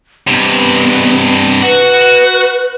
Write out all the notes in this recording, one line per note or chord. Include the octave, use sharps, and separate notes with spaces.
G2 C3 B3
F#4 B4 F#5